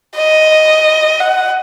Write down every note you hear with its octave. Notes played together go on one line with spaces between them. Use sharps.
D#5
F#5